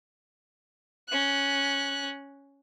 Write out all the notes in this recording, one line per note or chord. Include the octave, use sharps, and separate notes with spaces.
C#4 F#6